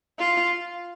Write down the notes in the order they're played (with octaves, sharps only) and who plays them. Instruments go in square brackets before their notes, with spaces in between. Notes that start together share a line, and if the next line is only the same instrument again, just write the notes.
[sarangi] F4